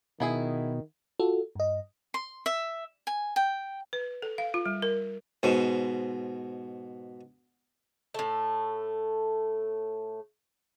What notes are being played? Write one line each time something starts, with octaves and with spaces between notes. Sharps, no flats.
B2 D#3 B3 E4 G#4
F4 F#4 A4
G2 D#5
C6
E5
G#5
G5
B4
A4
F5
F4
G3
A#4
G#2 B2 C5
A2 A3